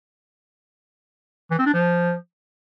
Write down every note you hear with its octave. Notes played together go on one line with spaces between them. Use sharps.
E3
C4
D4
F3